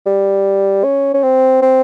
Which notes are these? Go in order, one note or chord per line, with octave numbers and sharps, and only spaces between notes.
G3
C#4
C#4
C4
C4